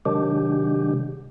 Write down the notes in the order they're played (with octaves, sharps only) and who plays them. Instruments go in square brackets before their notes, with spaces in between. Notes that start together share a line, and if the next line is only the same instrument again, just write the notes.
[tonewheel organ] C3 D#3 F#3 G#3 D4 G4